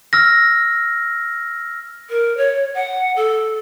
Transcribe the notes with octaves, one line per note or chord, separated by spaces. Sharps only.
E6 F6 A#6
A#4
C#5
F#5
A4